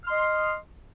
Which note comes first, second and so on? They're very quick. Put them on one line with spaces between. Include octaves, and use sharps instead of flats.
F6 C6 D#5